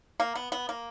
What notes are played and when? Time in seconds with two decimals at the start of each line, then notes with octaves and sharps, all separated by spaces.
0.20 A#3
0.35 B3
0.52 B3
0.69 A#3